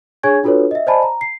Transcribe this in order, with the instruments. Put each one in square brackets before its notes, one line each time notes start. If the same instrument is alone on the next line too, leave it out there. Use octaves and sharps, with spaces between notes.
[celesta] D4 G#4 C#5 G#5 C#6 G#6
D4 F4 F#4 A4 B4 C#5
D#5 E5
C5 D5 D#5 G#5 A5 B5
A#5
C7